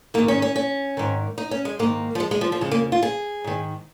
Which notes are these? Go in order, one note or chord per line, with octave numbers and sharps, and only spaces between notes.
G#2 D#3 A#3
C#4
C#4
C#4
G#2 D#3
D#4
C#4
G#3
G#2 D#3 A#3
F3
G#3
G#3
F3
F3
F2 C#3 G#3
A#3
F4
G#4
G#2 D#3